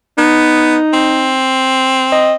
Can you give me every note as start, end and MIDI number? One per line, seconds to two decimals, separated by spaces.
0.18 0.77 59
0.18 1.40 63
0.93 2.34 60
2.12 2.34 75